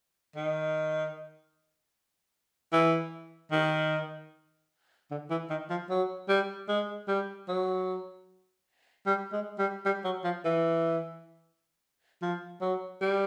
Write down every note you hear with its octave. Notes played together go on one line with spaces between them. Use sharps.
D#3
E3
D#3
D3
E3
D#3
F3
F#3
G3
G#3
G3
F#3
G3
G#3
G3
G3
F#3
F3
E3
F3
F#3
G3